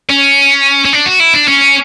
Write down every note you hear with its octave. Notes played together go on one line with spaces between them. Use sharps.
C#4
C#4
D4
F#4
E4
D4
C#4